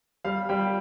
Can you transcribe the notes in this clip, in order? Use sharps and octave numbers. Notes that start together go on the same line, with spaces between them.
G3 F5
G3 G5